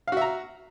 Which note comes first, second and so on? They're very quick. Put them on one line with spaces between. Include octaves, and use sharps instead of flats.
F5 F#4 E5 A#5